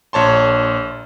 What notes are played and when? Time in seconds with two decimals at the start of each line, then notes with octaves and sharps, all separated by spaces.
0.13 A#1 C#5 A5 C6